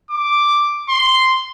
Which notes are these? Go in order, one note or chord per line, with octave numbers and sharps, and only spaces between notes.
D6
C6